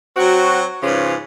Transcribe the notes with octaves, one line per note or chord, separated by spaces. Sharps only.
F#3 C4 F#4
G#2 C#3 F3 C#4 B4